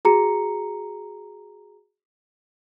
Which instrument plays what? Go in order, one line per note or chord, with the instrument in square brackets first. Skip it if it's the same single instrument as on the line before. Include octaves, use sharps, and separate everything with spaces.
[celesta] F#4 G#4 A#5 C#7